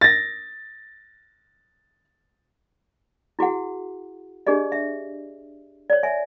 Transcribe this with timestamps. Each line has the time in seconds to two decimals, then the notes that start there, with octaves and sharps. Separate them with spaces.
0.01 A6 A#6
3.39 E4 F#4 G#4 F#5
4.47 D4 G4 G#4 D5 D#5
4.72 E5
5.90 C#5 D5
6.03 E5 G#5